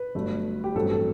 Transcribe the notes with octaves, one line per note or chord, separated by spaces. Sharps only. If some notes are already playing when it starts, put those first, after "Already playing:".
Already playing: B4
G1 G2 F#3 A3
G4
A1 G2 F#3 A3 C4 A4
A4